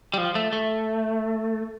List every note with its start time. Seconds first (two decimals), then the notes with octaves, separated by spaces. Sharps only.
0.14 G3
0.18 F3
0.35 A3
0.53 A3